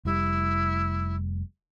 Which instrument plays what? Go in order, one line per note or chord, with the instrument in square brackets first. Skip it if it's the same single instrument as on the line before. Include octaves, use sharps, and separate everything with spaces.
[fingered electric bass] F1 G3 [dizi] E4